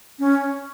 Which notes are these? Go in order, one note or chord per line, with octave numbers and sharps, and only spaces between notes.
C#4